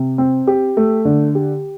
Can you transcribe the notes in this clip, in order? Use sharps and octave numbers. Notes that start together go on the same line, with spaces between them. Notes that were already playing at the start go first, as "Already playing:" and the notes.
Already playing: C3
C4
G4
A3
D3
G4